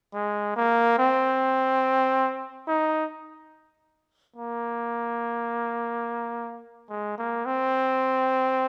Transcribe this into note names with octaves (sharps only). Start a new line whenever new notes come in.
G#3
A#3
C4
D#4
A#3
G#3
A#3
C4